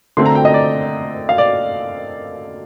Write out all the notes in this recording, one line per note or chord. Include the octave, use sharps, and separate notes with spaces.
D3 A3 C4 C6
A#5
G5
D#5
D5
F5
D5